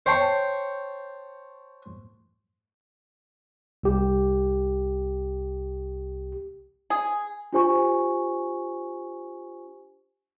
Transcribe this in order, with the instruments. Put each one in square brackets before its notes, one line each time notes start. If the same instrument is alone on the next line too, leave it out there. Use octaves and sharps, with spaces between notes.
[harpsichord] C5 C#5 G5 A5 C6 C#6
[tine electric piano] C2 G4
[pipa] G#4
[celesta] D4 F4 G4 C5 G#5 C#6